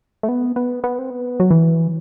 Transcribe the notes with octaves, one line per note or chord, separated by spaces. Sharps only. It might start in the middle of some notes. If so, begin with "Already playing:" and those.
A3
B3
B3
B3
C4
B3
F#3
E3